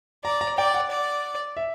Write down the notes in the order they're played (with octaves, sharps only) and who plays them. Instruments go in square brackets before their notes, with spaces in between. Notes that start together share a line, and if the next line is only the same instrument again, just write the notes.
[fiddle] D5 [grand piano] A#5
[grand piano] A#5
[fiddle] D5 [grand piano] G5
[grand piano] F#5
[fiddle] D5
[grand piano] E5